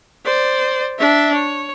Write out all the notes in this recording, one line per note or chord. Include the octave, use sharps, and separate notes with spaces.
C5 D5
D4 E5
C#5